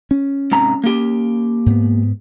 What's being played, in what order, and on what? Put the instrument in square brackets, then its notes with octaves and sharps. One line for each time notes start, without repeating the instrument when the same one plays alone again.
[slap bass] C#4
[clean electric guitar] G#2 C3 A#5
A#3 G4
[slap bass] G#2 B3